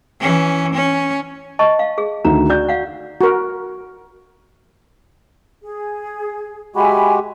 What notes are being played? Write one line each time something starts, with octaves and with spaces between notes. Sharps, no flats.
E3 C#4
C#4
D#5 A5 C#6
F5
G#4
D2 D#3 A#5
F#4 D5 G6
F5 F#5
F#4 A#4
G#4
G#3 F#4 G4 E5 G#5 B5